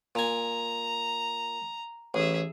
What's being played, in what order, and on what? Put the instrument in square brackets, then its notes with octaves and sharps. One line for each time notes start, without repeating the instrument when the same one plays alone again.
[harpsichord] A#2 G#5 [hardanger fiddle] A#5
[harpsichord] A1 [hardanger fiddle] G#4 E5